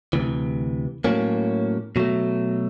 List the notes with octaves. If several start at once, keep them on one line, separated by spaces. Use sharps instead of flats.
D2 C3 E3
A2 F#3 A#3 C#4
B2 F#3 A3